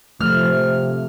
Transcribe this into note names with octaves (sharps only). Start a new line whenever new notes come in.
C3 F3 A3 F6